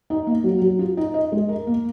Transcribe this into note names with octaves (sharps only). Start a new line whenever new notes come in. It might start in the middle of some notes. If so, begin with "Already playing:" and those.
D#4
A#3
F#3
F#3
F4
D#4
D#5
G#3
A#4
A#3